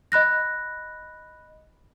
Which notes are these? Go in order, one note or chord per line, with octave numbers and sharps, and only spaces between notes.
D#5 B5 F#6 A#6